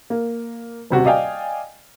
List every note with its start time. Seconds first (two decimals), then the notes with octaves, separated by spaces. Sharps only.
0.10 A#3
0.90 D#1 C3 F#4
1.05 D5 D#5 F5 G5 G#5